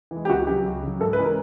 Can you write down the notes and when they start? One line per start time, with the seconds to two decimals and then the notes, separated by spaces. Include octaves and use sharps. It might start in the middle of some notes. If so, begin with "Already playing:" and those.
0.11 E3
0.16 G#3
0.25 G4
0.30 C#2 F#4
0.47 C#3 F#3 G4
0.65 C#2
0.83 C#3 F#3
1.00 G#2 A4
1.13 B4
1.19 E3 G#3 C#4
1.24 A#4